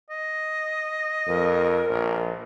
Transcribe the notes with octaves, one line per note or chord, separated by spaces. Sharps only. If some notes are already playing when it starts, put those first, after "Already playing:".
D#5
F2 A#4
A#1